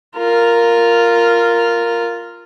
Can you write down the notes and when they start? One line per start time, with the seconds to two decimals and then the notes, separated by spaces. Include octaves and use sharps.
0.18 F4 A#4